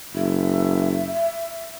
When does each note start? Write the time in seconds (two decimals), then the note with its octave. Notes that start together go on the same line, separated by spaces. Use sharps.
0.15 F#1 E5